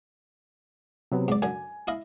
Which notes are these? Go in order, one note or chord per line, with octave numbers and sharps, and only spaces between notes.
C3 F#3 B3
G#2 D5
F#2 D3 G#5
E4 D#5 F5